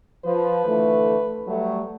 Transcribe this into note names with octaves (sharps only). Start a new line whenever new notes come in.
F3 B4
D3 E3 A3
F#3 G3 A3